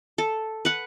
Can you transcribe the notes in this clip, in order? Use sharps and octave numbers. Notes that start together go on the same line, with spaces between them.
A4
B4 F#5